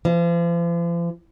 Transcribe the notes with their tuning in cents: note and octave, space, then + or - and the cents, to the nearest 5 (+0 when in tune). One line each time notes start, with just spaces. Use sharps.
F3 -40